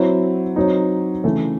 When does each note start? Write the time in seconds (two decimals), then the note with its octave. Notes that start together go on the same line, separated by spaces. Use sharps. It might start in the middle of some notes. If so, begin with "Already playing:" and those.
Already playing: F#3 C4 E4
0.56 F#3 C4 D#4
1.24 C#3 E3 A3